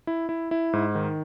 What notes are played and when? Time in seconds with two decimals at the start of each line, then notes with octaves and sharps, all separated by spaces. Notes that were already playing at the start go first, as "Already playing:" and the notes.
0.07 E4
0.29 E4
0.51 E4
0.73 G#2
0.95 D#3